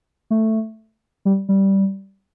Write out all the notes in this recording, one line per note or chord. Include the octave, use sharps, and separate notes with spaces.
A3
G3
G3